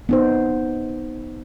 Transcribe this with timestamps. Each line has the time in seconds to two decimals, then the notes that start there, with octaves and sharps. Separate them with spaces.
0.09 B3 D#4 C5